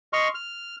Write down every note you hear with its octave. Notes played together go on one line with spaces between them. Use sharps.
D#5 C6 C#6 F6
F6